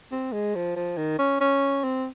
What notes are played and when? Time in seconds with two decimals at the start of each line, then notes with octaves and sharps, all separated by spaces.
0.12 C4
0.33 G#3
0.55 F3
0.76 F3
0.97 D#3
1.19 C#4
1.41 C#4
1.84 C4